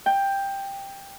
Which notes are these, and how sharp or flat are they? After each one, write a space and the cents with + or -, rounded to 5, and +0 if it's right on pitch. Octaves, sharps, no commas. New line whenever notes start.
G5 +10